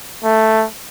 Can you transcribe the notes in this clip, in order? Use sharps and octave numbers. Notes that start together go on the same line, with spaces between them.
A3